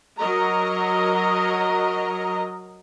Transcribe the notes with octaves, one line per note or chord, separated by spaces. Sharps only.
F#3 A#4 D#5 A#5